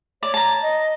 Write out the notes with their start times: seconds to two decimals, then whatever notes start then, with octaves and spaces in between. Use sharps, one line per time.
0.23 C#5 D5
0.34 A5 A#5
0.62 D#5